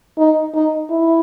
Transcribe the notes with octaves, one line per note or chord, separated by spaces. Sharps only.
D#4
D#4
E4